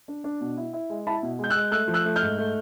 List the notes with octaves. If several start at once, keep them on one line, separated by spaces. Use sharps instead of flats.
D4
D4
B2
E4
E4
G#3
E4 A5 B5
B2
G#3 G6
E6 F#6
G#3
A3 E6 F#6
F3
E6 F#6
A3
F6 G6
G#2
A3